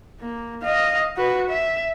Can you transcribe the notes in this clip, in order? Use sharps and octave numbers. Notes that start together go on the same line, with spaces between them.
A#3
D#5 F5
F#4 B4
E5